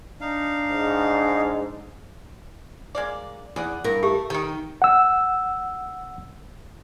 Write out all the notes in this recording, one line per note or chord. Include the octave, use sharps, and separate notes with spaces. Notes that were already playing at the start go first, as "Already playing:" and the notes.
D4 D#4 F5
G#2
G#3 A#3 D5
E2 G#4 D5 F#5
G2 A#4
A3 G4 A4
D#3 D#4 G5
F#5 E6